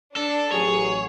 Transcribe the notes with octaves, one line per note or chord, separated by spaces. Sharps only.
D4 A4
A1 F#3 G#4 C#5